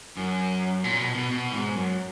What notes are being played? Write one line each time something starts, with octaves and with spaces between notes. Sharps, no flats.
F#2
A#2
B2
B2
B2
G#2
F#2